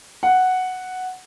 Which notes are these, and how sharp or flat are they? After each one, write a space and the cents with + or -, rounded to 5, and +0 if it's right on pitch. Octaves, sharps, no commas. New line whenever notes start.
F#5 +0